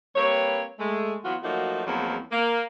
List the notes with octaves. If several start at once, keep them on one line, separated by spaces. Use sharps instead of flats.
G3 A#3 C4 B4 C#5
G#3 A3
E3 F#3 B3 F4 F#4
F3 F#3 A3 A#3 D#4 F#4
E2 F3 F#3 G#3 A#3 C4
A#3